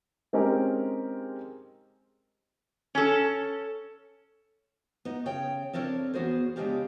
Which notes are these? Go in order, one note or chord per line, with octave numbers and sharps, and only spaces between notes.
G#3 C4 C#4 D#4 G4 A#4
C#4 A4
B3 D#4
C#3 C#5 G5
C4 D4 A4 A#4 C#5
E2 B3 F#4 G#4 C5
C#3 G#3 A3 D4 F4 G4